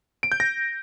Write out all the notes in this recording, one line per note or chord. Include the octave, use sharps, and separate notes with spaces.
D7
G6
A#6